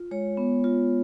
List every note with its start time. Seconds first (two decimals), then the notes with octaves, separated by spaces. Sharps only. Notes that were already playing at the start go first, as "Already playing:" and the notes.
Already playing: F4
0.11 G#3 C#5
0.37 B3
0.64 F4